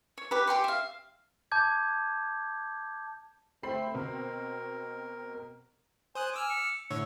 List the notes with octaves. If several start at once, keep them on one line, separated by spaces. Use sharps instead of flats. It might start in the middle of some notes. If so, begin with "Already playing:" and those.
C#5
G4 B4
G4 G5 C6 C#6
E5 F5
A5 D6 G6 G#6
A3 C4 C5 B5 C7
B2 C4 A#4
C5 G#5 D#6 F#6
D6 E6 F6
C#7
A2 D3 C#5 E6